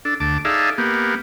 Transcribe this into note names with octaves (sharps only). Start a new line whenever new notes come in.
D4 A4
D2 A5 D6
D#4 G#4 A4 D5 E5 F5
A#3 B3 G4